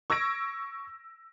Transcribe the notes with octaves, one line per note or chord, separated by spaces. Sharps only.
C#6 E6 G#6 A#6 D7